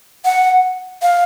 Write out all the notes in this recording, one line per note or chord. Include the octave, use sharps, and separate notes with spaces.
F#5
F5